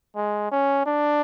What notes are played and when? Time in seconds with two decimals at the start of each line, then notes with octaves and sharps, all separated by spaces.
0.16 G#3
0.51 C#4
0.86 D4